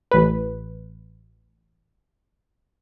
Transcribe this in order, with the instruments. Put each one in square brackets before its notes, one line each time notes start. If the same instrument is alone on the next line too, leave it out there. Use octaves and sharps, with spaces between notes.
[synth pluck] A1 B4